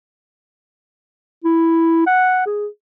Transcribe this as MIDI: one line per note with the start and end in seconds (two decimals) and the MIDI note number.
1.44 2.03 64
2.06 2.44 78
2.46 2.67 68